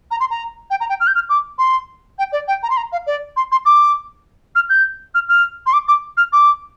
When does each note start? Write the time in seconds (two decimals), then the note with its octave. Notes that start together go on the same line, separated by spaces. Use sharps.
0.11 A#5
0.20 C6
0.30 A#5
0.70 G5
0.80 A#5
0.89 G5
1.00 F6
1.07 G6
1.15 F6
1.29 D6
1.58 C6
2.19 G5
2.32 D5
2.48 G5
2.63 A#5
2.70 C6
2.77 A#5
2.92 F5
3.07 D5
3.37 C6
3.52 C6
3.66 D6
4.55 F6
4.70 G6
5.15 F6
5.29 F6
5.66 C6
5.73 D6
5.88 D6
6.17 F6
6.33 D6